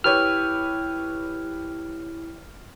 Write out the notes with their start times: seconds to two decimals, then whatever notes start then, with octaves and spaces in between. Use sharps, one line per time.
0.04 E4 G4 B4 C#5 F6